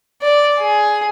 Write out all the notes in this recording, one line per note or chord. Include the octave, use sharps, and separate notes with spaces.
D5
G#4